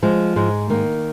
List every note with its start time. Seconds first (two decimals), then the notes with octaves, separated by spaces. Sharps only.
0.03 F3 G#3
0.36 G#2 G#3
0.70 D#3 A#3